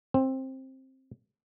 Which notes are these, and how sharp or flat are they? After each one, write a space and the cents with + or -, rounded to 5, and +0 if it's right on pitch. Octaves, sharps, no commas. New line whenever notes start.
C4 +15